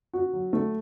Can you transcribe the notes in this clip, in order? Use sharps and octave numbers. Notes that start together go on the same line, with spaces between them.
F#4
F#3
A3